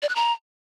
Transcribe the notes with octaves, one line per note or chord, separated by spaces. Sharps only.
D5
F#6
A#5